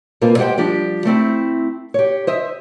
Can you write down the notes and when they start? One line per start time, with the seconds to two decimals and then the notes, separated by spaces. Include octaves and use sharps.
0.21 B2 A#3 C4 F4
0.38 G#3 G4 C5 F#5 G5
0.58 F3 G3 D4 G4
1.05 A3 C4 E4
1.94 G4 C#5
2.27 C5 D#5 E5